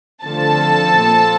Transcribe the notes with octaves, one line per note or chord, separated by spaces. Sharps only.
D3 F3 A3 C4 A4 A5
A#2 F3 C4